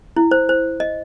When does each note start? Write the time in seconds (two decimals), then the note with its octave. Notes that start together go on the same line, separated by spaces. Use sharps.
0.16 E4
0.31 C5
0.49 C5
0.80 D#5